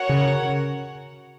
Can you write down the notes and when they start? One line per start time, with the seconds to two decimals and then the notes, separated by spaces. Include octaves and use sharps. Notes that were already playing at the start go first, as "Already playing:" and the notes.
Already playing: F#4 A#4 C#5 F#5
0.09 C#3